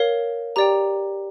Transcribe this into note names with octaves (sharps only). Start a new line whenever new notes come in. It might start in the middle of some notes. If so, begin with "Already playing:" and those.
Already playing: A#4 C#5 F5
G4 D5 G5 A#5